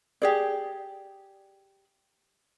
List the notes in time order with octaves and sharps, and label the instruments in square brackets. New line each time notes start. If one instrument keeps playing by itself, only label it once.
[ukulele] G4 G#4 D5